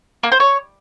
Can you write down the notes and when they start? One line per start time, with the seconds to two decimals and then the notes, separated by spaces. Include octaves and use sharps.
0.23 A#3
0.32 C5
0.40 C#5